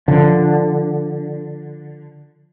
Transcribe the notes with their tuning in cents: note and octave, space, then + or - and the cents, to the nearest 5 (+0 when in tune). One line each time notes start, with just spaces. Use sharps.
D3 +0 F3 +0